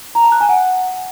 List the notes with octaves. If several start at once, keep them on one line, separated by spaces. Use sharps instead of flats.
A#5
A5
F#6
G#5
F#5